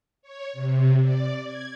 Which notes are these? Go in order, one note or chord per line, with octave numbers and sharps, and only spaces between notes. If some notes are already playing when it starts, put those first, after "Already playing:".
C#5
C3
D5
G#6